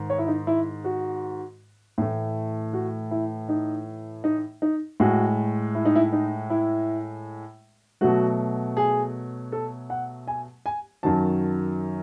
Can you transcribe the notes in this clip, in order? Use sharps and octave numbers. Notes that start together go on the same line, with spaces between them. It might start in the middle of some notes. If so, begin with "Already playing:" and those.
Already playing: G#2 D#3
C#5
E4
D#4
E4
F#4
A2 E3 A3
F#4
E4
D#4
D#4
D#4
A2 G#3 F#4
E4
D#4
E4
D#4
E4
B2 F#3 A3 F#4
G#4
A4
F#5
G#5
G#5
F#2 D#3 F#3 A5